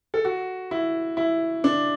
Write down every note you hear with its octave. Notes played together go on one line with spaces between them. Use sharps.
A4
F#4
E4
E4
D4